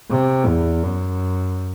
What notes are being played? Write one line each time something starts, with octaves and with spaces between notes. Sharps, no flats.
C3
E2
F#2